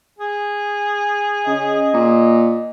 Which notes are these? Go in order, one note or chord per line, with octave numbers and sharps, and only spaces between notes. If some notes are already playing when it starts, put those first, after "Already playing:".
G#4
C#3 D#5
A#2